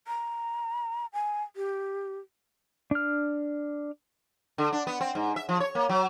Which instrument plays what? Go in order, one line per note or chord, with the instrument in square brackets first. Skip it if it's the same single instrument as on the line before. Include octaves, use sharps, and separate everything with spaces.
[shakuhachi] A#5
G#5
G4
[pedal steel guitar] D4 F6
[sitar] D3
D4
B3
C4
G#2
E5
F3
C#5
A#3
F#3